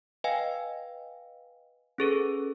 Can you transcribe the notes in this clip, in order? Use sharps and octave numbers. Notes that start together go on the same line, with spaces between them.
B4 D#5 F5 G5 G#5
C#4 G#4 A4 B4